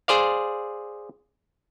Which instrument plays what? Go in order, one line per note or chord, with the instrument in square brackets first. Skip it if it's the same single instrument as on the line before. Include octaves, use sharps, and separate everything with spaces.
[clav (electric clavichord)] G#4 C5 D5 F5